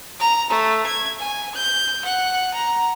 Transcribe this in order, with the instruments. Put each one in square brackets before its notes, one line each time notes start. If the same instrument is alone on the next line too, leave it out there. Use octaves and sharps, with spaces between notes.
[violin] A#5
A3
G#6
G#5
G6
F#5
A#5